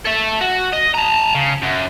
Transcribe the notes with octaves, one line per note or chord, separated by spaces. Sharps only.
A4 E5
F#4
D#5
A5 A#5
C#3
F#2